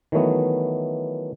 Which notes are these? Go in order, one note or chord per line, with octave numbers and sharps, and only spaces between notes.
D#3 E3 F#3 A3 B3